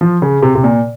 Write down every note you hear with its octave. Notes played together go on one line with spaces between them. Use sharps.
F3
C#3
C3
C3
A#2